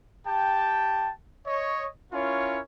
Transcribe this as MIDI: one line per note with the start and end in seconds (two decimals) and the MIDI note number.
0.26 1.10 67
0.26 1.10 79
0.26 1.10 81
1.45 1.87 73
1.45 1.87 75
2.12 2.59 61
2.12 2.59 64
2.12 2.59 65
2.12 2.59 70
2.12 2.59 73